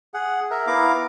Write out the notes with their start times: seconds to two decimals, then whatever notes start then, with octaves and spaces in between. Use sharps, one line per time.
0.14 G#4 F#5
0.51 A#4 E5
0.67 B3 E4 F5 A#5 D6